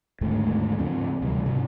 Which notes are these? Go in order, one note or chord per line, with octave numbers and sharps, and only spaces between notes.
D#2 G#2 D3 A3
G#2 C#3 F3 C4
D2 C3 E3 G3
G#2 C3